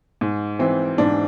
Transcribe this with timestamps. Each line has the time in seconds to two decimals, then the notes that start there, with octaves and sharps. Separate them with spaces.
0.21 G#2
0.59 E3 C4
0.98 G#2 D4